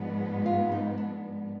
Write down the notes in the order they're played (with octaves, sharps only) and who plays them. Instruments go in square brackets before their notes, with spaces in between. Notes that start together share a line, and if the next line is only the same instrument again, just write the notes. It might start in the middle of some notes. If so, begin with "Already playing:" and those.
Already playing: [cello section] G#2 F3 G#3 B3 [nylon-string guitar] D4
[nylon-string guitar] F4
D#4
D4